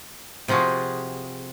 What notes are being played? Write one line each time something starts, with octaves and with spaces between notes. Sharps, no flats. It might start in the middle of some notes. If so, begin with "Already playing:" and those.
C3 F3 F4 F#4 G#4